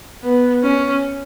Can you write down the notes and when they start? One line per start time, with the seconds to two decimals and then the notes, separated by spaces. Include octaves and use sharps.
0.23 B3
0.63 C#4